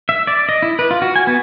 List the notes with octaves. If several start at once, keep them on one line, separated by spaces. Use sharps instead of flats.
E5
D5
D#5
E4
B4
F4
F#4
G#5
B3